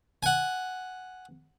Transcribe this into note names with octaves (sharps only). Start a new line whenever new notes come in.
F#5 G#5